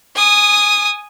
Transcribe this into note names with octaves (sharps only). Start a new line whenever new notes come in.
G#5 D#6